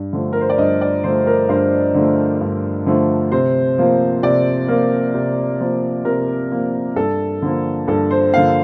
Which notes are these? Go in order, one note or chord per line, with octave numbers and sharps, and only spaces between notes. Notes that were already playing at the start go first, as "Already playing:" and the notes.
Already playing: G2
D3 F3 A3
A#4
C5
D5
G2 D#5
D5
D3 F3 A3 C5
A#4
G2 C5
D3 F3 A3
G2
D3 F3 A3
C3 C5
F3 A#3
C3 D5
F3 A#3 A#4
C3
F3 A#3
C3 A#4
F3 A#3
G2 A4
D3 F3 A#3
G2 A4
C5
D3 F3 A#3 F5